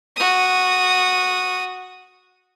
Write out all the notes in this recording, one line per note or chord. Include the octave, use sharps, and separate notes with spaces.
F#4 D#6